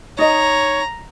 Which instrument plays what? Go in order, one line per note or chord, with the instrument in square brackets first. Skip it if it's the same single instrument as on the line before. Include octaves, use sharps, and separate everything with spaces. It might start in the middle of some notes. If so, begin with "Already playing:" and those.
[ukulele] D#4 D#5 [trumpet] C#5 [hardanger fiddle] A#5